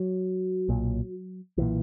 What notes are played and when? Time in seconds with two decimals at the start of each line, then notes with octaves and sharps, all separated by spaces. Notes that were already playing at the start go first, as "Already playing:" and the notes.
Already playing: F#3
0.69 B1 A#2
1.57 B1 A#2 E3